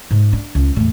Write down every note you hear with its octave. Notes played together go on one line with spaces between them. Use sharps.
G#2
D4
C#2
E2 A2